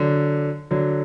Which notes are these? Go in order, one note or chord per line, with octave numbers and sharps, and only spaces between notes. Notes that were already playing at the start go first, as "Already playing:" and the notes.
Already playing: D3 F#3
D3 F#3